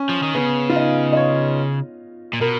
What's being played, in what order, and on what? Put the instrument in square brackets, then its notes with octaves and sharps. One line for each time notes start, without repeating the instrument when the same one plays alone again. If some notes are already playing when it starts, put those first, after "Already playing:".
Already playing: [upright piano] C#4
[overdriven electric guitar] F3
D#3
[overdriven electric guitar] C#3 [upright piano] B3
[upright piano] F4
D#4
D#5
C#5
[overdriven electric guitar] A#2
[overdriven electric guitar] B2 [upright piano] A#4